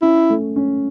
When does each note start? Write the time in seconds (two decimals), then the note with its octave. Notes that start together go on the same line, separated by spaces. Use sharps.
0.02 C#4 E4
0.30 A3
0.56 C#4